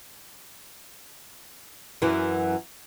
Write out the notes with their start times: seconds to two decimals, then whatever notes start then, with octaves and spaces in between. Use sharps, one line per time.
2.02 F#2 E3